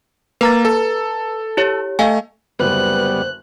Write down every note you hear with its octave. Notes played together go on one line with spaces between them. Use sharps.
A#3 B4 A#5 A6
A4
E4 G4 C#5
A3 D#5 F5 G#5
F#1 D2 G3 B3 B4 C5 F#6